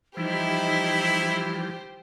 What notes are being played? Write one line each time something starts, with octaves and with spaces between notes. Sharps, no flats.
E3 F3 G3 D#4 E4 G4 C5